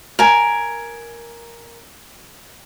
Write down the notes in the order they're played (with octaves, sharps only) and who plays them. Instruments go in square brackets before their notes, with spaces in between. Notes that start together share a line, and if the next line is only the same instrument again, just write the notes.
[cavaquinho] A#4 G#5